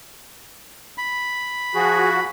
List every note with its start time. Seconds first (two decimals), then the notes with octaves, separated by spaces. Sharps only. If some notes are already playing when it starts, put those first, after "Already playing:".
0.98 B5
1.75 F3 F#4 G#4